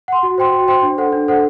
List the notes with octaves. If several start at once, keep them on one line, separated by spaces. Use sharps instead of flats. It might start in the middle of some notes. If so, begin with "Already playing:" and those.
F#5 C6
F#4
C5 G5 C6
F#4
C5 G5 C6
D4
A4 C5 F#5
D4
A4 C5 F#5